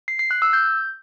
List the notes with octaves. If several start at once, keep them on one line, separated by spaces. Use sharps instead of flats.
C7
C7
F#6
E6
G6